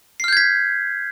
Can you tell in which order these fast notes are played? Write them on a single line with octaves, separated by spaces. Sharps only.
C7 F6 G6 G#6 B6